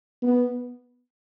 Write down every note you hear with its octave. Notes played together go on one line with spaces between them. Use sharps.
B3